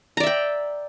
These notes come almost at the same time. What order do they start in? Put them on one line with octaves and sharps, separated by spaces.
A#5 D5 E5 G5